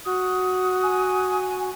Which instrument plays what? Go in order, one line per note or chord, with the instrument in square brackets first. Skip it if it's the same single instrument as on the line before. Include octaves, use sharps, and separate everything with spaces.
[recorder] F#4 [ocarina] D#6
[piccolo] G#5